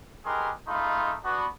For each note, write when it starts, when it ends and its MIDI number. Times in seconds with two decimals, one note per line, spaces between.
0.25 0.51 63
0.25 0.51 67
0.25 0.51 68
0.25 0.51 70
0.25 0.51 71
0.25 0.51 84
0.68 1.15 56
0.68 1.15 57
0.68 1.15 63
0.68 1.15 65
0.68 1.15 83
0.68 1.15 84
1.24 1.47 59
1.24 1.47 62
1.24 1.47 66